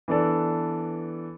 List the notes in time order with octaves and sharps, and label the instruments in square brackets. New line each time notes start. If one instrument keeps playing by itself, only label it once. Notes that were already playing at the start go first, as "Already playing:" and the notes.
[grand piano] E3 B3 D4 A4 D5